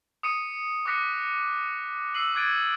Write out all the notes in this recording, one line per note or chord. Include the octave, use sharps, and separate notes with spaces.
D#6 C#7 D#7
D6 D#6 F#6 A#6 B6 C#7
E6 C7 D#7 F#7
D6 F#6 G#6 A6 D7 D#7